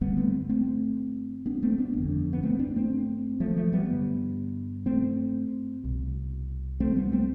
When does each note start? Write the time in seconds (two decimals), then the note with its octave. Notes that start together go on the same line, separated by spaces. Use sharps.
0.01 G1 G2 D3 G3 B3
0.17 A3 C4
0.49 A3 C4
1.46 B3 D4
1.63 A3 C4
1.78 B3 D4
1.95 G1 F2 D3
2.33 B3
2.43 A3 C4
2.59 B3 D4
2.76 A3 C4
3.40 F3 A3
3.56 F3 A3
3.73 G3 B3
3.89 A1 G2 D3
4.86 A3 C4
5.83 C2 B2
6.80 A3 C4
6.96 G3 B3
7.12 A3 C4